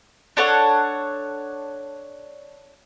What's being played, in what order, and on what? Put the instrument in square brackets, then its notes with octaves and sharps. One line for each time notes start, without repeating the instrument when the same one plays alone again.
[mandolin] D4 A4 C#5 F#5